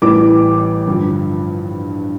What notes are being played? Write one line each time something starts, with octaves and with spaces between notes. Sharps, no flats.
A1 A2 E3 G3 D6
G2 D3 F3